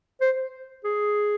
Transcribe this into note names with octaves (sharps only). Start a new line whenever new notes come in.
C5
G#4